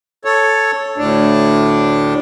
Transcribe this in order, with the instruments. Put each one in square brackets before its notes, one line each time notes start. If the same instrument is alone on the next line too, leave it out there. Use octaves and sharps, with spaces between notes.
[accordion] A4 C#5
D2 A2 D4